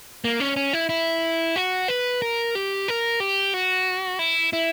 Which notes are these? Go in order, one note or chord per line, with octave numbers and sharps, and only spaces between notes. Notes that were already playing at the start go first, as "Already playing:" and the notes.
A#3
C#4
C#4
E4
E4
F#4
B4
A#4
G4
A#4
G4
F#4
E4
E4